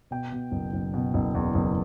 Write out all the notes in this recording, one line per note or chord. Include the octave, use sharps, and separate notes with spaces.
B2 G5
B2
F#1
F#1
B2
F#1
E2
F#1